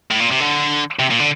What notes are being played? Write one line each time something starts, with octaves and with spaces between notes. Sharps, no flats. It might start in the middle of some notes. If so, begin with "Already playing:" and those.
A2
A#2
C3
D3
C3
A#2
D3